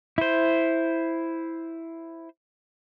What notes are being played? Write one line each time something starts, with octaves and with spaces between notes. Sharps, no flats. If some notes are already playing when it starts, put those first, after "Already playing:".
E4 C5